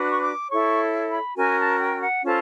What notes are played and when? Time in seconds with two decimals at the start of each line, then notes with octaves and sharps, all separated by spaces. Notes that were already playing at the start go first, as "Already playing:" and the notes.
Already playing: D4 F#4 B4
0.09 C#6
0.21 D6
0.49 E4 A4 C#5 C#6
1.07 B5
1.36 C#4 F#4 A#4 G#5
1.58 A5
1.79 G5
2.01 F#5
2.23 C#4 F4 A4 C5 A5